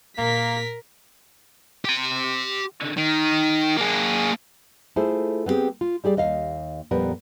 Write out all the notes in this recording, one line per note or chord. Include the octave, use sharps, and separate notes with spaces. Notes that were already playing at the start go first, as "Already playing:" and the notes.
A#2 A#3 A#4 B6
G4 C6
D#3
A#3 G#4
A3 E4 F4 G#4 A4 C5
B3 C4 D#4 G4 G#4
F4
G3 G4 G#4 D5
D#2 D#5 F5
F2 A#2 G3 B3 A#4 B4